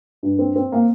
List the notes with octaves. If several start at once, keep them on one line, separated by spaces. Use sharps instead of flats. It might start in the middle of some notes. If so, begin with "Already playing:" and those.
G2
C4
C4
A#3